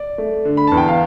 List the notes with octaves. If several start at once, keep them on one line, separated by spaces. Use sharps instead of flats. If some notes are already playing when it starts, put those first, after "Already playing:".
Already playing: D5
A3
D3
B5
E2 A5
G5
F5